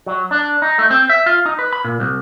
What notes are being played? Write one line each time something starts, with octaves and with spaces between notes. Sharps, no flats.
F#3
D4
D#4
A3
C4
E5
F4
D#4
B4
B5
A#2
C2